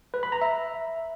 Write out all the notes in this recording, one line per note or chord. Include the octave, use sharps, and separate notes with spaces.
B4
B5
A#5
E5